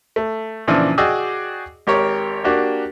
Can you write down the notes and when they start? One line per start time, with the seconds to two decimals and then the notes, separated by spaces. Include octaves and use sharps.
0.16 A3
0.68 A#2 C#3 E3 F3 D4
0.98 F#4 G#4 D5 D#5 G5 E6
1.87 G#1 G4 A#4 C#5
2.44 A#3 D4 F#4 G4